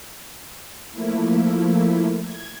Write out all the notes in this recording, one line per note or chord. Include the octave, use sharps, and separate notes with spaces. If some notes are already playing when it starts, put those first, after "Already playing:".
F3 A3 A#3 E4
G#6